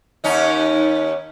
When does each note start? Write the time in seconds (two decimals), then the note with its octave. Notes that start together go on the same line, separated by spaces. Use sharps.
0.24 D#2 C#4 D#4